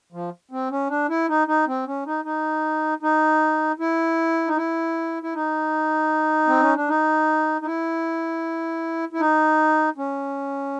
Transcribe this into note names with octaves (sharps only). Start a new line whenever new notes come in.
F3
C4
C#4
D4
E4
D#4
D#4
C4
C#4
D#4
D#4
D#4
E4
D#4
E4
E4
D#4
C4
C#4
D4
D#4
D#4
E4
E4
D#4
C#4